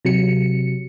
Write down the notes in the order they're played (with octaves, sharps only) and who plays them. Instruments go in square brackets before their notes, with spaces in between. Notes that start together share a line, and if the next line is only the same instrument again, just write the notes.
[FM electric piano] C3 F#3 C#7